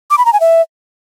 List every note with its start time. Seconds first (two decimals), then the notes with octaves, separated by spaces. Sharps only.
0.10 D6
0.18 B5
0.25 A#5
0.33 G#5
0.40 E5